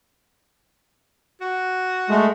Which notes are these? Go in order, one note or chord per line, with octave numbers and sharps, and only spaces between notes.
F#4
G#3 A3